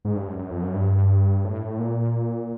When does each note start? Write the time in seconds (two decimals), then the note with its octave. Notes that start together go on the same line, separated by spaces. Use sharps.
0.05 G#2
0.16 G2
0.28 F#2
0.39 F#2
0.50 F2
0.62 F#2
0.74 G2
1.44 A2
1.79 A#2